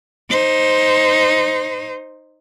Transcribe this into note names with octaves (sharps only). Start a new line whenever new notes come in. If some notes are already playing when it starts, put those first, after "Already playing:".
D#4 C5